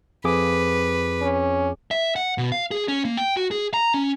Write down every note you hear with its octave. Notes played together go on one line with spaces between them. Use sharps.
F2 G#4 B4 D6
C#4
E5
F#5
B2
F5
G#4
C#4
A#3
G5
F#4
G#4
A#5
C#4